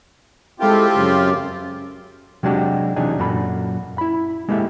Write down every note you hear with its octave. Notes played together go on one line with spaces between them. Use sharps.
G#3 C4 E4 F4 G4 A4
F#2 C#3
C3 F#3 G#3 D4 F#4 G4
C3 E3 F#3 D4 D#4 G#4
F#2 A#2 F#4 A4 B5
E4 B5
G#3 A#3 E4 G4 A4 E5